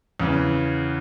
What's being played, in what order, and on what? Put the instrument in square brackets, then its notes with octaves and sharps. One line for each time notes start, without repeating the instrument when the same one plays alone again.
[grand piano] E2 C#3 E3